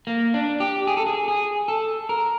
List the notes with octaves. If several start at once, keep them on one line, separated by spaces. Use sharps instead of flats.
A#3
D4
G4
G#4
A4
G#4
G#4
A4
A#4